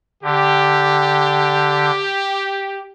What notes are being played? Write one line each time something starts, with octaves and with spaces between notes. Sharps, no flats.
D3 G4